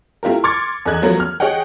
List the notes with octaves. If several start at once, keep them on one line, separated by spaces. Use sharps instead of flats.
A3 E4 F4 G4 A#4
C6 D6 F6 G#6 A6 C#7
E2 A4 D#5 F#6 G#6
F3 F#3 A3 B3 A#4
F6
G#4 C#5 D#5 F#5 G5